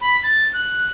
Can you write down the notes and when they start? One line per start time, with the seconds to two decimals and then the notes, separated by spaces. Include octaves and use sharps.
0.01 B5
0.23 A6
0.53 F#6